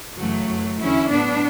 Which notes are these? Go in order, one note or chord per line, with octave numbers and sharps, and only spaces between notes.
F#2 C#3 E3 F#3 A3
F#2 E3
E2 D3 F#3 C#4 E4
A2 F#3 B3 D4